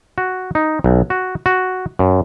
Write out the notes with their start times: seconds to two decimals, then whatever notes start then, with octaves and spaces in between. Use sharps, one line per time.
0.18 F#4
0.55 D#4
0.84 B1
1.10 F#4
1.46 F#4
1.99 F#2